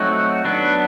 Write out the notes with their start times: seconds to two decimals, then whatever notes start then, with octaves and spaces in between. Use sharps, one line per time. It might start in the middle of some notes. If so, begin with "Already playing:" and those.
Already playing: F#3 A3 C4 D#4 F#4
0.45 F#3 B3 D4